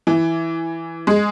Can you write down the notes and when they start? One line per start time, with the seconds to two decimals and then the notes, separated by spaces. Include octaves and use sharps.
0.07 E3
1.07 G#3